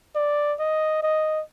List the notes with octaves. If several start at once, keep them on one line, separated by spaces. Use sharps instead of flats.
D5
D#5
D#5